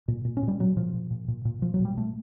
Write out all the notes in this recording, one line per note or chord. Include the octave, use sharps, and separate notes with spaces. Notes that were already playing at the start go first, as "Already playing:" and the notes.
A#2
A#2
C#4
A#2
G3
A#2 F#3
A#2 F3
A#2
A#2
A#2
A#2
A#2 F3
F#3
A#2
G3
A#2 A3